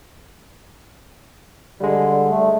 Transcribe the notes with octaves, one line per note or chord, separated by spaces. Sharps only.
D3 G3 G#3
A3